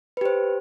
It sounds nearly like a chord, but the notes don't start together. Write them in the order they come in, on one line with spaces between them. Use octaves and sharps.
B4 G4 C5